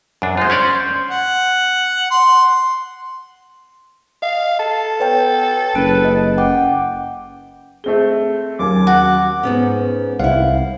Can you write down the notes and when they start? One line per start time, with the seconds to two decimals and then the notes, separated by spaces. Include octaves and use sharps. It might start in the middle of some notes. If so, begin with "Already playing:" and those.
0.22 F#2 D4
0.37 G#3 F4 C5
0.50 C#4 C#5 D5
1.10 F#5
2.11 C6
4.22 D#5 F5
4.59 A4 A5
5.00 B3 B4 C#5 G5
5.75 F#1 B4 F#6 D7
6.05 D#5
6.38 F#5 G5 D6
7.84 A3 C4 G#4 G7
8.59 D#2 F#3 A#3 C#4 D6
8.87 F#4
9.43 G#2 B3 C#4
10.19 C2 C4 E4 F5 F#5